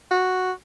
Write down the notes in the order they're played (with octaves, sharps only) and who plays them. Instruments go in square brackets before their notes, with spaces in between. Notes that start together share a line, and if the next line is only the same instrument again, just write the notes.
[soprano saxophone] F#4